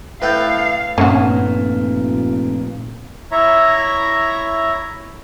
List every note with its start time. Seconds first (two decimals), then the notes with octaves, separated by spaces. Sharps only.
0.22 A2 A4 B4 F5 G5 G6
0.98 F1 G2 A#2 C#4 F#4
3.31 E4 C#5 E5 A#5